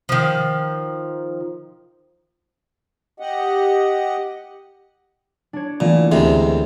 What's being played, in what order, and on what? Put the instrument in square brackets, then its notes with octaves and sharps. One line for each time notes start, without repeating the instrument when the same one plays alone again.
[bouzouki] D#3 F3
[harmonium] G4 D#5 F#5
[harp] D4 C#5
[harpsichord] A#2 [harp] E3 A3 B3
[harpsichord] D2 G#2 C3